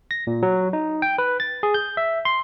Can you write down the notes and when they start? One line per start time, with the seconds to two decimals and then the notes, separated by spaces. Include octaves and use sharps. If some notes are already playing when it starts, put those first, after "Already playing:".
0.11 A#6
0.27 A#2
0.42 F#3
0.73 D#4
1.02 G5
1.18 B4
1.40 A6
1.63 G#4
1.74 G6
1.97 E5
2.25 C6